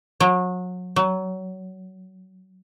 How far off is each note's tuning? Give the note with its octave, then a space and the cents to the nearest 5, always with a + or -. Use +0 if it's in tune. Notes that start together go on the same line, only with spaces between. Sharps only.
F#3 -30
F#3 +20